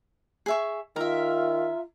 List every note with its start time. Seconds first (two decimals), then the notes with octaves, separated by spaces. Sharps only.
0.46 G#4 E5 C#6
0.96 D#3 F4 A#4 E5 A#5